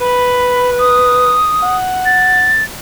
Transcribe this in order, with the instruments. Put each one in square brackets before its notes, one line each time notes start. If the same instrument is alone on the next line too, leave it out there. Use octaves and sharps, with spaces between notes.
[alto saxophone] B4 [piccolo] B5
[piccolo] D#6
[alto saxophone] F#5
[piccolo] A6